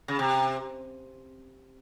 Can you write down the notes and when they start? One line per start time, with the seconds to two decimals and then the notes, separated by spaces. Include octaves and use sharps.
0.08 C#3
0.19 C3